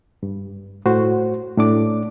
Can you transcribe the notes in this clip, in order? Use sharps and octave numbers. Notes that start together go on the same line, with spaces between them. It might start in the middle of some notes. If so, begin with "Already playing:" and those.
G2
A2 F#4 C5
A2 D4 D6